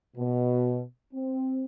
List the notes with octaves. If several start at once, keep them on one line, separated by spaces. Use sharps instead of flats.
B2
C4